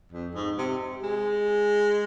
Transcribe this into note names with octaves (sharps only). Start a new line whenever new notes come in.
F2
G#2
C3
G#3